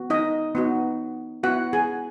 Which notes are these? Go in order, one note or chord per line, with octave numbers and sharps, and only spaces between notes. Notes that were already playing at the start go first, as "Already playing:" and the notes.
Already playing: B3 F#4
D#4 D#5
B3 D#4 F#4
B3 E4 F#4 F#5
G#4 G#5